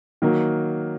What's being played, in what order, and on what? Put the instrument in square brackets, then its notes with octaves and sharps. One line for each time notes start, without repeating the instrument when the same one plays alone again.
[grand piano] D#3 F#3 A#3